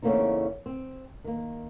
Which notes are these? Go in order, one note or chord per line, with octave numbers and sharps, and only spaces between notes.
E2 C#3 A3 A#3 C4 D#4
C4
D#3 A#3